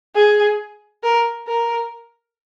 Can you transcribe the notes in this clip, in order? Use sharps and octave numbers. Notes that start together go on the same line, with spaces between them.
G#4
A#4
A#4